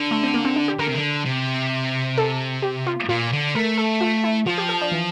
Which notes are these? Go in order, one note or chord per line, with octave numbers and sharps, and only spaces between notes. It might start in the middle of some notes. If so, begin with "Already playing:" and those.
Already playing: D3
A3
C4
A#3
C4
D4
G4
D3 A#4
C3
D3
C3
A4
G4
F4
A#2 F4
D3
A3 A#4
A4
F4
E4
F3 F4
G4
A4
D4
E3